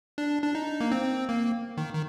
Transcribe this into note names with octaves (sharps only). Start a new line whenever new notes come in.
D4
D4
D#4
A#3
C4
A#3
D#3
D#3